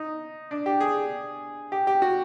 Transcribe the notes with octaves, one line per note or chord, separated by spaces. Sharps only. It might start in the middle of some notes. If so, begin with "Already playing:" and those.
Already playing: D#4
D4
G4
G#4
G4
G4
F#4